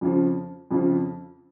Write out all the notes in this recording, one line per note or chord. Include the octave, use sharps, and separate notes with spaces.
F2 C#3 F3
F2 C#3 F3